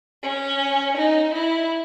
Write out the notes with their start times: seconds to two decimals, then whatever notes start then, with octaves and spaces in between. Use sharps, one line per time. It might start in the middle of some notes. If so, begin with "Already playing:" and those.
0.23 C#4
0.97 D#4
1.34 E4